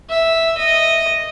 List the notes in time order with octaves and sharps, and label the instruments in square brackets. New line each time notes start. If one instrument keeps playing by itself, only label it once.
[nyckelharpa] E5
D#5